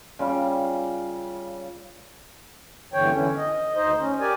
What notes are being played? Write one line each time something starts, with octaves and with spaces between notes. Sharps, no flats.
C#3 G3 F4
E2 G2 D3 E3 C#5 G5
D3 E3 C#4
D#5
D2 D#4 C5 D#5
C#4
G4 A#4 D5 G#5